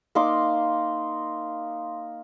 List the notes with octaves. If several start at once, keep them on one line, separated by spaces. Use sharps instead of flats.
A#3 D#4 C6 D6